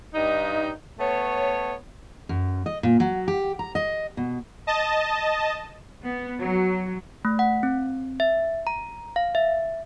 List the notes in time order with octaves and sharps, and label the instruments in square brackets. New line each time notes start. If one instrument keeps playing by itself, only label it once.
[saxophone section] G2 D#4
A3 B3 C#5
[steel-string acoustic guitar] F#2
D#5
A#2
F#3
G4
A#5
D#5
B2
[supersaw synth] D#5 A5
[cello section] B3
F#3
[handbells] A3
F#5
C4
E5
A#5
F5
E5